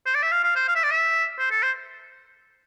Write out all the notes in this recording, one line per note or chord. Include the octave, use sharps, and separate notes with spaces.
C5
D5
E5
F5
F5
C5
F5
E5
D5
E5
C5
A4
C5